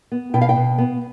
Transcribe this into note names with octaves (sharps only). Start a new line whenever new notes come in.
B3
B2 G5
F5
G5
B2
B3